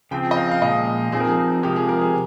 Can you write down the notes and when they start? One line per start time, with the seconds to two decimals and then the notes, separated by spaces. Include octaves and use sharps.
0.11 C#3 F3 C4 G5
0.31 D#5
0.37 F5
0.51 F5
0.62 A#2 F3 G#3 D#5
1.12 F3 C4 D#4 G#4
1.20 A#4
1.28 G#4
1.63 C3 F3 G#3 G4
1.76 G#4
1.89 A#4
2.01 G#4